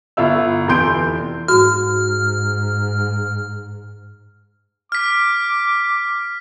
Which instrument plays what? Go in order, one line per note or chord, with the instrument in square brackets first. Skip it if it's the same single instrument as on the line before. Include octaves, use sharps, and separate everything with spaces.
[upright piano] G1 E4 F4 E6
F1 E3 B3 C6 G6 D7
[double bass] G#2 [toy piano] F#4 [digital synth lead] F6
[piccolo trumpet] D6 [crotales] F6 B6